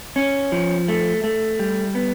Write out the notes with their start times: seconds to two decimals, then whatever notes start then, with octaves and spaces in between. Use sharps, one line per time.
0.16 C#4
0.52 F3
0.88 A3
1.24 A3
1.59 G3
1.95 B3